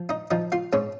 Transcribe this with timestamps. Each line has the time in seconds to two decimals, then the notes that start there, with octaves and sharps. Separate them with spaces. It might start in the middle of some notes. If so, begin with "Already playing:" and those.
Already playing: F3
0.09 D#4 D#5
0.31 F3 D#4 D#5
0.52 F4 F5
0.73 G#2 C#4 C#5